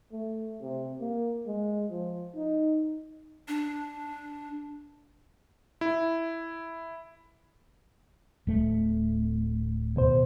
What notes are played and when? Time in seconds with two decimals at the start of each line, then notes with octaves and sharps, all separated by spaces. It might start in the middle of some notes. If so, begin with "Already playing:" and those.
0.12 A3
0.61 C3
1.00 A#3
1.47 G#3
1.91 F3
2.35 D#4
3.48 D4
5.81 E4
8.47 D1 A3
9.96 D#2 B2 C5